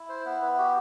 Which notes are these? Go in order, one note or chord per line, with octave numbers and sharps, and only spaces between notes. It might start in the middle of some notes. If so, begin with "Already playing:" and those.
Already playing: E4
C5
B3 B4
B4
F#4 G4